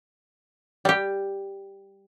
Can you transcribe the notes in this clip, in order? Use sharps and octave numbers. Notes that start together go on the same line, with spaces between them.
G3 G4